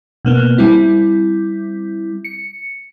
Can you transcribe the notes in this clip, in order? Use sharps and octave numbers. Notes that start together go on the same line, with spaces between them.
B2 A#3 B3
G3 C4 E4
C#7